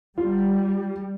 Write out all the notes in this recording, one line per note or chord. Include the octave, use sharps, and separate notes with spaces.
G3 F4